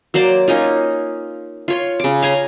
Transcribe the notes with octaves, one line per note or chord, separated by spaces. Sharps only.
F#3 A#3 C5 D5
A#3 C#4 D#4 F4
F4 C#5 C6
C#3 D6
F5 G#5 A#5 C6